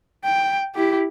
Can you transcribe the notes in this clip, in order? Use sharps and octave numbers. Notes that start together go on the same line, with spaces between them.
G5
E4 G4